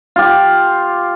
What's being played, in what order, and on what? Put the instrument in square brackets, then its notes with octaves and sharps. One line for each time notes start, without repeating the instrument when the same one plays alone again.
[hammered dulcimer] F4 G4